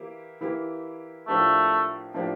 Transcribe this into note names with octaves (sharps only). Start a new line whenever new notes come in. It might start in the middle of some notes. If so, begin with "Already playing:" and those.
Already playing: E3 A#3 E4 G4
E3 A#3 E4 G4
A2 F3 A3 A#3 D4 G4
A2 F3 A#3 D4 G4